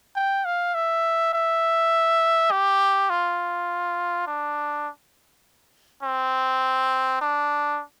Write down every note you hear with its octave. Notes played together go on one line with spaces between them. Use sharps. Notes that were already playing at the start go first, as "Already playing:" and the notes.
G5
F5
E5
E5
G4
F4
D4
C4
D4